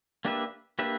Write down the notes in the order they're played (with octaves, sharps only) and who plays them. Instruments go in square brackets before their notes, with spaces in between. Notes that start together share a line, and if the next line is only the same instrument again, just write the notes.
[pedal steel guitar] A#3 D4 G4 B4 E5
A#3 D4 G4 B4 E5